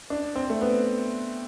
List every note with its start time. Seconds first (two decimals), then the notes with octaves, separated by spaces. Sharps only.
0.10 D4
0.35 C4
0.50 A3
0.61 B3